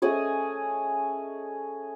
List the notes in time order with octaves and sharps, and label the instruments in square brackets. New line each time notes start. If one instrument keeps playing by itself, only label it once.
[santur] A3 C#4 G#4 D#5